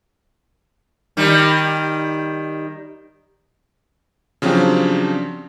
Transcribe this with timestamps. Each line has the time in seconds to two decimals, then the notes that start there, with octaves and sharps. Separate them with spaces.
1.17 D#3 G3
4.42 C#3 F3 F#3 C4 D4 G4